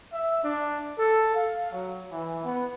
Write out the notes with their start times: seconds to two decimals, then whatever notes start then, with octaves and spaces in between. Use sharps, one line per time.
0.13 E5
0.43 D4
0.98 A4
1.34 F5
1.70 F#3
2.11 E3
2.43 B3